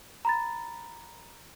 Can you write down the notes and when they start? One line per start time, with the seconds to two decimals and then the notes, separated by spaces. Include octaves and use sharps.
0.25 A#5 B5 A6